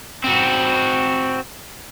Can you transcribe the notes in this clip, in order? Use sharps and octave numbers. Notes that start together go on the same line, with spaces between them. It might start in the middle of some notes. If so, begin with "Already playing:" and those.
C4 F#4